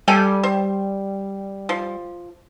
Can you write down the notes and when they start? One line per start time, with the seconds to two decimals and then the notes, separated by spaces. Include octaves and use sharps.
0.08 G3 A4 G5 G#5
0.43 C5
1.69 F3